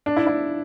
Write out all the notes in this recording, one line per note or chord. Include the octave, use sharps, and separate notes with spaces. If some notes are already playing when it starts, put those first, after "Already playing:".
D4
E4
E4